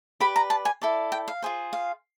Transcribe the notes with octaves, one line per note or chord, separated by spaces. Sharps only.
G4 B4 D5 B5
A#5
A5
G#5
E4 A4 D5
G5
F5
F4 G#4 C5
F5